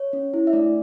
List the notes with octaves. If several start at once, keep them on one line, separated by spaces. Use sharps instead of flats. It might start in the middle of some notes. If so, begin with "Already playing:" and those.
Already playing: C#5
C#4
E4
E5
A3 D4 D5